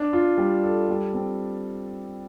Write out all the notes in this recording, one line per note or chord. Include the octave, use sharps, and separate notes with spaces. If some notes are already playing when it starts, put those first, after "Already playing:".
Already playing: D4
F4
G3
A4
G3
C4